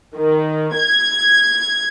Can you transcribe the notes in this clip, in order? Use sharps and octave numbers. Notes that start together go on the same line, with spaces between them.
D#3
G#6